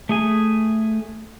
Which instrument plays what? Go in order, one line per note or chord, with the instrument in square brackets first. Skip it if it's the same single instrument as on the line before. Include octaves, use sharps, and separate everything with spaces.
[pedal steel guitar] A3 G#4 G#5